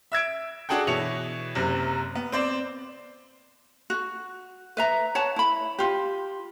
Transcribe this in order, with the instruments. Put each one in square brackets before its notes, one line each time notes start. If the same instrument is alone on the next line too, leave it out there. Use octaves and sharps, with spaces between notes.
[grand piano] E5 E6 G#6 D7
D4 F#4 G#4 A4 G5
B2 E3 E4 C#5 C#7 F7
F#1 F#2 C3
B3
C4 C5 D5
[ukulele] F#4
B4 E5 A#5
C#5 F#5 A5
E4 B5
F4 G4